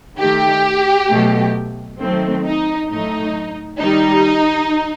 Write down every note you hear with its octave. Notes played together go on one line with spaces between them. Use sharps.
D#3 A3 G4
B2 F#3 A3
D#3 F#3 A3 C4
D#4
A2 F#3 A3 D#4
D#3 G3 D#4